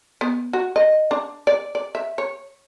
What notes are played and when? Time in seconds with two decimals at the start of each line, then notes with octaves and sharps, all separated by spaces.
0.21 B3
0.53 F#4
0.76 D#5
1.11 D4
1.47 D5
1.75 D5
1.95 E5
2.18 C#5